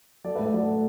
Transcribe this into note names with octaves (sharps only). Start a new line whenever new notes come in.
F#3 A4 D5
B4 E5
A2
B4 E5
F#3 A4 D5
A2